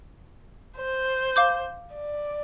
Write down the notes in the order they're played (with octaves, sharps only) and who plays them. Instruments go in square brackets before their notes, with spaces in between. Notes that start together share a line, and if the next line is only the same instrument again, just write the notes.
[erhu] C5
[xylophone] F5 D6 G6
[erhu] D5